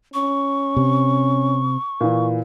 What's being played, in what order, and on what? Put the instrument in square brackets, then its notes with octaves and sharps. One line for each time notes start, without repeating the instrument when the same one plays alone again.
[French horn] C#4 [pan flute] C#6
[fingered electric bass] C3
[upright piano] A#2 E3